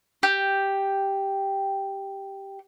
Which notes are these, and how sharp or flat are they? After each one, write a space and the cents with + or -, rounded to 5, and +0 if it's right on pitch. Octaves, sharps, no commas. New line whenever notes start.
G4 +0